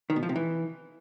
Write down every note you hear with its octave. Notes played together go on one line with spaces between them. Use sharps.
D#3
B2
F3
C3
E3